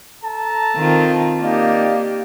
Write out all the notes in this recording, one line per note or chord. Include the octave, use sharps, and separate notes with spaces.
A4 A5 A#5
D#3 C4 F4
A#3 D#4 G4 D5 F5